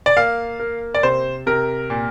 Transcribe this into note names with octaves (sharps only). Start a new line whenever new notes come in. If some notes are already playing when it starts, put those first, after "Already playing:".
D5
A#3 F5
A#3
D5
C3 C5
C3 A#4
A#2